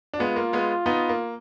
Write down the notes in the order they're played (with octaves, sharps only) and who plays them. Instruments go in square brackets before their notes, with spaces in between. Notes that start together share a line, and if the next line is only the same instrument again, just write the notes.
[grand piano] D4
[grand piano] G#3 B3 [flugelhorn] F4
[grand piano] A#3
G#3 B3
B3 D#4
A#3